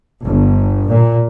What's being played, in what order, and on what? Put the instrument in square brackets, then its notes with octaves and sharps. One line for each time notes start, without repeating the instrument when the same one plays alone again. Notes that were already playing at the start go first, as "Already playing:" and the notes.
[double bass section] G1
A#2